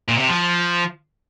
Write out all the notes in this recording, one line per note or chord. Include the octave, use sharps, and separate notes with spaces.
A#2
C3
F3